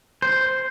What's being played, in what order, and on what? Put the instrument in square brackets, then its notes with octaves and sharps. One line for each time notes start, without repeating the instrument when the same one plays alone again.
[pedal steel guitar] C5